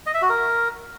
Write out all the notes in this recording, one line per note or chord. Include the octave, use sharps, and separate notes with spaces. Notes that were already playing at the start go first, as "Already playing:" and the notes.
D#5
E5
F#4
A#4